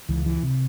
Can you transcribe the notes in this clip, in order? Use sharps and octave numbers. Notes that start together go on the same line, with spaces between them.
C#2 E3
E3
C3